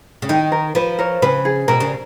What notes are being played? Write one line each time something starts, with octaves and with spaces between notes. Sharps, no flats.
C#3
D#3 D#4
A#4
F3 B4
A#4 C#5
C#3 B4
G#4
B2 A#4
C#3